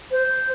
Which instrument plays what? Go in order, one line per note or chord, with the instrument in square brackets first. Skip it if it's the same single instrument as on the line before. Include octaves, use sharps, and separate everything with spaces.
[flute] C5